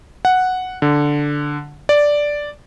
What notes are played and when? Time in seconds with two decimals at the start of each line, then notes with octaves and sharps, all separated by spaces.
0.25 F#5
0.82 D3
1.89 D5